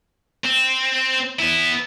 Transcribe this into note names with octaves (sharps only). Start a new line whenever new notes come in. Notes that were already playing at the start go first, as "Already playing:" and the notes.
C4
B3 E4